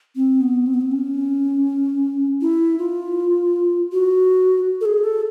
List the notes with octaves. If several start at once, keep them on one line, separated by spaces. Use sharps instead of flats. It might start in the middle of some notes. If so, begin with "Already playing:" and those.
C4
B3
C4
B3
C4
C#4
E4
F4
F#4
A4
G#4
A4